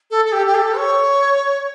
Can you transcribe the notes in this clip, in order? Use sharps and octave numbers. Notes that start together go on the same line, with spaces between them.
A4
A4
G4
G4
A4
C#5